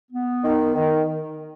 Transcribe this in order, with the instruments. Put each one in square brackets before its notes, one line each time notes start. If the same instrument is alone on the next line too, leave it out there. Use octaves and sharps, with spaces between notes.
[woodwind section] B3
D#3
D#3